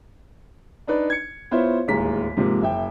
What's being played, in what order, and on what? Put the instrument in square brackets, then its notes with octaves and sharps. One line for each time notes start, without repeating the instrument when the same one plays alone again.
[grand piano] D4 D#4 B4 D5
G#6 C#7
B3 E4 F4 C5 C#5 E5
D1 D#2 G#3 A#5 B6
G#2 C3 F3 A#3
F#1 E5 G5